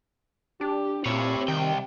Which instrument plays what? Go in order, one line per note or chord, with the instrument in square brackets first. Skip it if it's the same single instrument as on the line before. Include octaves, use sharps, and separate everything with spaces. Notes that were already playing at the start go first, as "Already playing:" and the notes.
[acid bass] D4 [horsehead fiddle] G4
[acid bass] A#2 [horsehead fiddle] C4 G4 [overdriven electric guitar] E4 C#5
[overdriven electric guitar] C2 G5 [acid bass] D#3